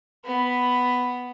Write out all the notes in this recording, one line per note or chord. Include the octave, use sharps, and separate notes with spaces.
B3 B5